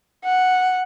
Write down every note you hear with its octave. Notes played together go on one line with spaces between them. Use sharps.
F#5